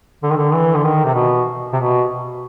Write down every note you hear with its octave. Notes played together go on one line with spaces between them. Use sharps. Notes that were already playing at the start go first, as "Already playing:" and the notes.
D3
D#3
D3
E3
D3
D#3
C3
B2
C3
B2